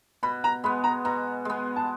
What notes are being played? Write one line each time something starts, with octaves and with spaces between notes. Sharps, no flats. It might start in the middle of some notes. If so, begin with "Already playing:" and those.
B2 B5
A#5
G#3 B3 B5
A#5
B2 A#5
G#3 B3
A5